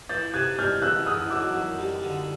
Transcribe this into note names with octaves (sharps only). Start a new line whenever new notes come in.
E3 G6 A6
C3 F#6 G#6
G3 F6 G6
E2 E6 F#6
E2 D#6 F6
F#3 D6 E6
F#2
G3
D3